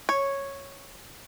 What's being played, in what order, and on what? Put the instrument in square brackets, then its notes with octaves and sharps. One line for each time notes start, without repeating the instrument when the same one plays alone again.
[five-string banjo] C#5